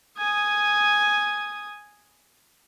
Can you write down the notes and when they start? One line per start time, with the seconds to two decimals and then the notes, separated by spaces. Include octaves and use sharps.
0.18 G#5 D#6